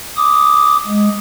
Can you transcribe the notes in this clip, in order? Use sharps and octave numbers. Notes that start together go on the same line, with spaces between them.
D6 D#6
G#3